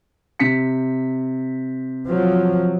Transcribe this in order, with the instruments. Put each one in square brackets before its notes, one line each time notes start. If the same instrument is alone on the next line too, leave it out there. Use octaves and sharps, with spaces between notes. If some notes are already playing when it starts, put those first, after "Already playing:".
[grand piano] C3 B6 C#7
[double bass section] F3 F#3